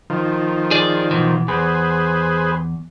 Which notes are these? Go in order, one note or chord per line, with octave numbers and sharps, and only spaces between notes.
D#3 F3
G#4 D5
B2 E3
E2 G#4 B4 C5